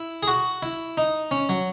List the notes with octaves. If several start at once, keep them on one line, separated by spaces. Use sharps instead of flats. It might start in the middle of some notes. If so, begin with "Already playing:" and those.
Already playing: E4
G#4
F#4
E4
D#4
C#4
F#3